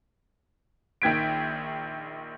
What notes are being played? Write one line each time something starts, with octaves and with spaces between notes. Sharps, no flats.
A#1 D#3 G5 G#6 B6 D7